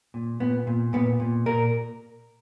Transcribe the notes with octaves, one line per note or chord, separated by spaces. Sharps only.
A#2
A#2 B3
A#2
A#2 B3
A#2
A#2 A#4